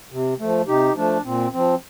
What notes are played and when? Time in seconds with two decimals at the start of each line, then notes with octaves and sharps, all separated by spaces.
0.11 C3
0.39 F3 A3
0.67 C3 D#4 G4
0.95 F3 A3 D4
1.24 A#2 C4
1.52 F3 C4